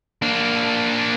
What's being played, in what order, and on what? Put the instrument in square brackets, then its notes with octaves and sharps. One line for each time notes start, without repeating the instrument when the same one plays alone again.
[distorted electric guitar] A#3 D4